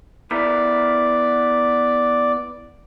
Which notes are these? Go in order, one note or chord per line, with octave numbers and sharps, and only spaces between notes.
B3 E4 A#4 D5